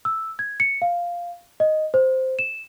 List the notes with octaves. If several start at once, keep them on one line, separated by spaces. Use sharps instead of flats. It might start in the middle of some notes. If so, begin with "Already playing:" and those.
E6
G#6
C#7
F5
D#5
C5
E7